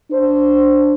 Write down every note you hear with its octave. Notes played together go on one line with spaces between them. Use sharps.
D4 C5